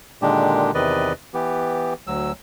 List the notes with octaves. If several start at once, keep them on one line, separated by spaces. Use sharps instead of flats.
A#2 D3 D#3 G#3 D4 G4
E2 C3 D#3 B4 D5 D#5
E3 B3 G4
D2 F#3 E6